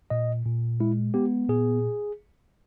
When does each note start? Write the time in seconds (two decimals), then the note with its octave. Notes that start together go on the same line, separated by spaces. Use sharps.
0.10 A#2 D#5
0.46 A#2
0.80 G#3 E4
1.14 B3 G4
1.49 A#2 G#4